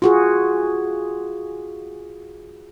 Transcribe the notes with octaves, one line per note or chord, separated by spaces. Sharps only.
F4 F#4 G#4